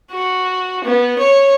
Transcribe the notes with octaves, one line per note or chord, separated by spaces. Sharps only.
F#4
B3
C#5